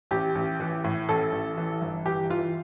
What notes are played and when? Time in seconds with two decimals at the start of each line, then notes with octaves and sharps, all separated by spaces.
0.11 A1 G4
0.35 A1
0.60 E3
0.84 A2
1.09 A1 A4
1.32 A1
1.57 E3
1.82 G1
2.05 E3 G4
2.30 E3 F4